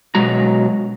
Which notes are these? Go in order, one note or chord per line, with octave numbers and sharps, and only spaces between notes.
B2 F#3 G#3 F#4 A#5